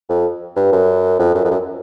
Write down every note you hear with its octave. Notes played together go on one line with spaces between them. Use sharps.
F2
G2
F#2
F2
F#2
F2
F#2